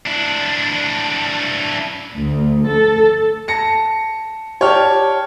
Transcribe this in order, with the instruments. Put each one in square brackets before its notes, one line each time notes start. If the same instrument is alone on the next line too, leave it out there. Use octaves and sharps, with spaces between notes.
[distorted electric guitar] D4 E4
[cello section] D2
A4
[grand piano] A5 A#6 C#7
G4 C#5 D5 G5 A5 F6